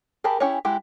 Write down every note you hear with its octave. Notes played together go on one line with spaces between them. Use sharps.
G4 G#4 A#4 A5 B5
C#4 E4 G4 G#4 C#5
G#3 E4 F#4 G4